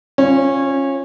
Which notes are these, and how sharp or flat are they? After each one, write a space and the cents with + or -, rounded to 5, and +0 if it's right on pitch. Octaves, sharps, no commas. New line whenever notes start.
C#4 -20 F4 +0